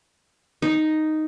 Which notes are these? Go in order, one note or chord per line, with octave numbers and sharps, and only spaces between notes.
D#4